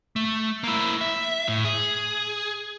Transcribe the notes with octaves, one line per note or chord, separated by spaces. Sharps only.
A3
A#3 E4
E5
A2
G#4